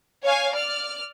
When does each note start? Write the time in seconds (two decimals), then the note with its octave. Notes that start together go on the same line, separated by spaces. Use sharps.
0.24 C#5 F5 G#5
0.54 D5 F6